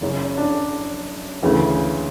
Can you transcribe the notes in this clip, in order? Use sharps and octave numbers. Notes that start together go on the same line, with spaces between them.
F#1 F#2 C#3
D4
D2 C#3 E3